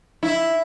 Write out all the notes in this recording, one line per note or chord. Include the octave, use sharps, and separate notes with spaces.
E4